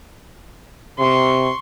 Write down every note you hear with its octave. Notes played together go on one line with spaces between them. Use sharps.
C3 C6 C#6